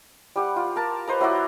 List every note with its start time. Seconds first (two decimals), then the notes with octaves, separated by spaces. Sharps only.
0.36 G3 G4 F#5
0.56 F4
0.76 A#4 A5
1.07 B4 C5 D#5 A#5
1.20 F#3 E4 F#4 D5